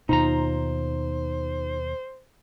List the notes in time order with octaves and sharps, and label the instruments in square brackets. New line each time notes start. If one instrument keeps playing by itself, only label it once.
[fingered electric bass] D#2 B2 [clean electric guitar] D#4 F4 A#5 [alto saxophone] C5